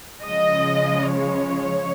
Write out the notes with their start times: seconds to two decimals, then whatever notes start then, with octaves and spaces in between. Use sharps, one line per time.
0.24 C#3 F3 G#3 D#5
1.14 C#5